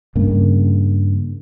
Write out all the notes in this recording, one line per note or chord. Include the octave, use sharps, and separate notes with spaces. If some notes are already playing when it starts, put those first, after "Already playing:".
G2 C#3 A#3